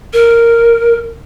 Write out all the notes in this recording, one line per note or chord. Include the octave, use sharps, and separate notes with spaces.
A#4